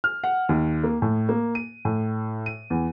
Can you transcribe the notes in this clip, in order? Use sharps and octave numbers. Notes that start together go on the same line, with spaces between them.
F6
F#5
D#2
A#3
A2
A#3
D#7
A2
D#7
E2